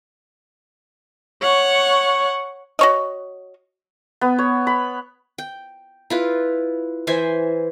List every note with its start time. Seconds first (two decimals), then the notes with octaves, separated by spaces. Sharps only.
1.42 C#5 F#5 C#6
2.79 F#4 C#5 D#5
4.21 B3
4.38 C#5
4.67 B5
5.38 G5
6.10 E4 F4 B4
7.07 E3 C5 E5 G#5